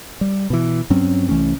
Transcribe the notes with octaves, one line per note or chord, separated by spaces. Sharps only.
G3
B2 E3
G2 F#3 C4 C#4
C2 E3 A3 C#4